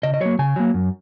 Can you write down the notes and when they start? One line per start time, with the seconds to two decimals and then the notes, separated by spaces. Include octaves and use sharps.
0.03 C#3 D#5
0.14 D#5
0.21 F#3 A#3 C#5
0.39 C#3 G#5
0.56 F#3 A#3
0.74 F#2